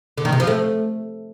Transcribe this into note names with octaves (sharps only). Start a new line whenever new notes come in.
D3
D#3
C3
F3
A3